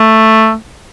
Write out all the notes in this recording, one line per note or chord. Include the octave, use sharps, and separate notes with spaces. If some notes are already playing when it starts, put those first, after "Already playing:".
Already playing: A3